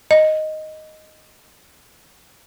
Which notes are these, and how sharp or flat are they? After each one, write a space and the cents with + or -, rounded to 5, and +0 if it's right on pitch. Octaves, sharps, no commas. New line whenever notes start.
D#5 +0